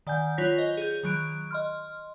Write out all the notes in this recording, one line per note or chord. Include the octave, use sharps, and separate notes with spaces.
D#3 D5 F#5 G#5 G6
F#3 F4 C#5 G6 A#6 B6
C5 D#5
G#4 G6
D#3 F#3 D7
D#5 C6 F6